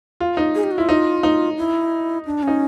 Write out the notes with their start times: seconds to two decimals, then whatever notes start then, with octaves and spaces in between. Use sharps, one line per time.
0.20 F4
0.37 D#4
0.55 G#4
0.63 G4
0.71 F#4
0.78 E4 F4
0.89 D#4
1.23 D#4
1.57 E4
2.26 D4
2.43 C#4 D#4